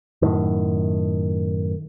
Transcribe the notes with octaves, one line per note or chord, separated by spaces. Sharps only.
F#2 A2 D#3